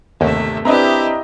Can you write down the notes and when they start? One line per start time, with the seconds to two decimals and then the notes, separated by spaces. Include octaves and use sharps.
0.21 G1 D#2 C3 A3 E5
0.65 C4 D4 E4 G4 B4 D#5 E5 A#5